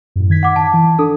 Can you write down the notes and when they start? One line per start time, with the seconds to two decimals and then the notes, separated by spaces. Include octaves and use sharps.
0.16 F#2 A2
0.30 D#3 G#6 B6
0.43 F#5 D6
0.56 A5
0.74 E3
0.99 D4 A4 D#6